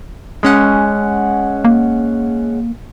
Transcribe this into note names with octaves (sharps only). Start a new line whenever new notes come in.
G#3 C#4 F#5
A#3